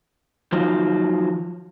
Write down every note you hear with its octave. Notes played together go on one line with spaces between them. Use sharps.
D#3 F3 F#3 D#4 F4 F#4